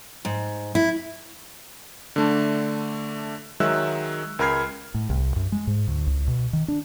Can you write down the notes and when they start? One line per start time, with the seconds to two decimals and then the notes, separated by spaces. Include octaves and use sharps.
0.25 G#2
0.75 E4
2.16 D3 A3 D4
3.60 D#3 F#3 G#3 E5 E6 F#6
4.39 C#2 A#4 B5 F6 G#6 C7
4.94 A2
5.10 C2
5.36 F#2
5.52 G#3
5.67 G#2
5.88 D2
6.07 C#2
6.27 B2
6.53 D#3
6.68 D4